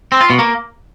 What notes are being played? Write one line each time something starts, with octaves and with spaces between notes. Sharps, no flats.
C4
F4
B2
A#3